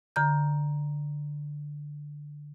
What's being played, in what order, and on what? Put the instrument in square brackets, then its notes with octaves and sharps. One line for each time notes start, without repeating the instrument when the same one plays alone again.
[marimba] D3 A#5 G6